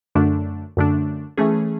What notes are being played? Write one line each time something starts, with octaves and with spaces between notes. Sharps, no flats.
F#2 D3 A3 D4
F#2 D3 A3 D4
E3 A3 C#4 G#4